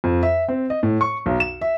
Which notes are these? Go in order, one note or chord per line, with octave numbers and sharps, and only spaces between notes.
F2
E5
C4
D#5
A2
C#6
B1
E7
E5